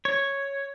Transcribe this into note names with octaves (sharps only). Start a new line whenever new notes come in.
C#5